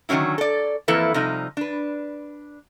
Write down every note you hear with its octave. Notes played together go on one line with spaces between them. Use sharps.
D3 D#3 F3 F#3 C#4 E4
A4 D5
F2 E3 A#3 E4 A4 B4
C3 F3 G3 D#4
D4 B4